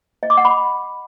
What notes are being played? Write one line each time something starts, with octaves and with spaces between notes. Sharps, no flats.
D#5
D6
F#5
B5